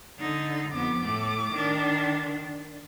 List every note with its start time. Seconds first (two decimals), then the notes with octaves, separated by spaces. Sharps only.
0.20 D3 D#4
0.73 F2 B3 D6
1.03 A2 A3
1.54 D#3 D4